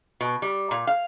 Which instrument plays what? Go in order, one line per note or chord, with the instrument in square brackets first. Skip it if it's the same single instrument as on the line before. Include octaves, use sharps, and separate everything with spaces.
[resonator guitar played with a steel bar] B2
G3
A#2
F5